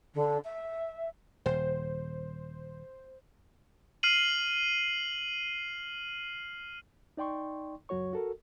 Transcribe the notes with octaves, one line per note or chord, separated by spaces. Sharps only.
D3
E5
D#1 C5
F6 C7 D#7 F#7
D#4 D5 G5 C6 C#6
C#2 F#2 F#3 F#4 C#5 C#6
F#4 A4 A#4